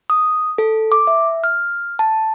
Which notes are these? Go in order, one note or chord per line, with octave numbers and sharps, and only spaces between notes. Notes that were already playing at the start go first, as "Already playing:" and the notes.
D#6
A4
D6
E5
F6
A5